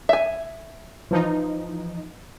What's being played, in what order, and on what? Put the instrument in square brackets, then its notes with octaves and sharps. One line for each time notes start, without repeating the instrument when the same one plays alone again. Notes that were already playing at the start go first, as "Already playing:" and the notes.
[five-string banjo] E5 G#5
[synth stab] E3 F3 D#4